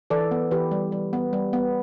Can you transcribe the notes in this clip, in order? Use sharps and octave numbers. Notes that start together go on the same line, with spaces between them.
E3 A4 D5
B3
E3 G4 B4
G3
G3
B3
G3
B3